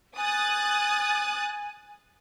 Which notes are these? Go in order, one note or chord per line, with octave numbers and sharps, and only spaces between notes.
G#5 D#6 F#6 A6